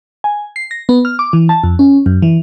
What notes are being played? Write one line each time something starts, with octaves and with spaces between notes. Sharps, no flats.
G#5
C7
A#6
B3
F6
D6
E3
A5
F2
C#4
F#2
E3